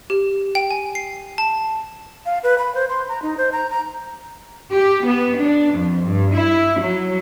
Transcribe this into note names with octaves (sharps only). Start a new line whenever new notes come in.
G4
G5
G#5
C7
A5
F5
B4
B5
C5
C6
A#5
D#4
C5
A#5
A#5
G4
B3
D4
F2
G2
E4
F#3